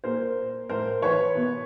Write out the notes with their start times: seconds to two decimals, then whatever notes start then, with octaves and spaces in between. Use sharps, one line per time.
0.04 A#2 A#4 C5
0.69 A2 A#4 C5
1.02 E3 B4 C#5
1.36 B2